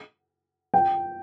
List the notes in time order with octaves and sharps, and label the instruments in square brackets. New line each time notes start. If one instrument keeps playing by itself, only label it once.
[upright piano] G5